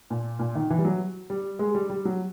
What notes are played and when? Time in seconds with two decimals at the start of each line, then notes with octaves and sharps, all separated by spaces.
0.10 A#2
0.39 A#2
0.55 D#3
0.70 E3
0.79 G3
0.85 F#3
1.30 G3
1.59 G#3
1.75 G3
1.90 G3
2.05 F#3